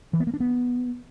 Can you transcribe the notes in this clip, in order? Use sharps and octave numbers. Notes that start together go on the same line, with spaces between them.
E3
B3
A#3
D4
B3